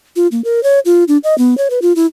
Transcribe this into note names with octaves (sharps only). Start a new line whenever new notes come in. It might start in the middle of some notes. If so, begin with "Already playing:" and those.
F4
A#3
A#4
C#5
F4
D4
D#5
B3
C#5
B4
F4
E4